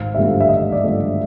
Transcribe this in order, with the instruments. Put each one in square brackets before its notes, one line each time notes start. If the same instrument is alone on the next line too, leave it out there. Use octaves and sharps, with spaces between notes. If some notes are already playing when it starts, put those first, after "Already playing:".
Already playing: [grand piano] G#1 F5
G2 D3 F3 A3 E5
E5
G#1 D#5
D5
G2 D3 F3 A3